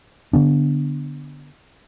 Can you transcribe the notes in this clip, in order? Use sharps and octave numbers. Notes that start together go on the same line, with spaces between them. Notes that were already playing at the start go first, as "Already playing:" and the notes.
D3 B3 D4